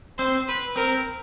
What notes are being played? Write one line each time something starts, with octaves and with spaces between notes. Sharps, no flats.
C4 C5
B4
C4 A#4